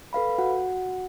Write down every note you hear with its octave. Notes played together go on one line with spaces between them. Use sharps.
A4 B4 F5 B5
F#4 F#5